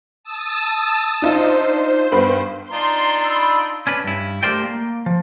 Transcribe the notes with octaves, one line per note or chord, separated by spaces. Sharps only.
A5 D#6 E6
D4 D#4 F4 C5
G2 B3 B5
D4 D#4 F4 A#5 C6
B5 E6
C#4 D4 B4
G2 E4
A3 G4 A#4 C5 D5 G5
A#3
F3